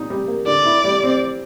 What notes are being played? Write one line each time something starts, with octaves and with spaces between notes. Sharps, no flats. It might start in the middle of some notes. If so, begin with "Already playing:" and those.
Already playing: A#2 D#4
G3
A#3
D3 D5
E4
G3
C4